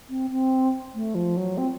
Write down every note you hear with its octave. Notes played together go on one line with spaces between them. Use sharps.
C4
C4
A3
F3
F#3
C4